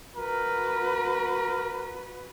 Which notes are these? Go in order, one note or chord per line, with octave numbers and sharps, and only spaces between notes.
F#4 A#4 B4